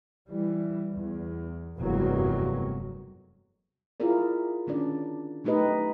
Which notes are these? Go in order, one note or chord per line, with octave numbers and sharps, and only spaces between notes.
E3 G3
E2
F1 E2 G2 F#3 G3 A#3
E4 F4 G#4 A#4 D5
D#3 C#4 D4 D5
F#3 A3 D#4 G4 B4 D#5